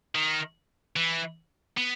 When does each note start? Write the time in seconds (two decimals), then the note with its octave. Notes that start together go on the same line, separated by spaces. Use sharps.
0.15 D#3
0.96 E3
1.77 B3